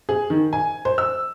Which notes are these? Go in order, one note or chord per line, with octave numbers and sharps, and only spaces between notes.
G#4
D#3
G#5
C5
E6